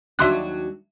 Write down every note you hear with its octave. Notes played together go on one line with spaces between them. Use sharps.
D#2 F#3 D4 E5 C6 F#6